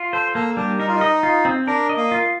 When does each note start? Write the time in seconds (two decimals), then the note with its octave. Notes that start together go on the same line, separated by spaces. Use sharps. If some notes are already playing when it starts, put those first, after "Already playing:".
Already playing: F4
0.13 A4 C5
0.35 A#3 A4
0.57 G3 D4
0.79 D#4 A#4
0.88 F4
0.96 D#4
1.01 D#5
1.23 F4
1.45 C4
1.67 D4 A#4
1.89 D#5
1.97 A#3
2.12 F4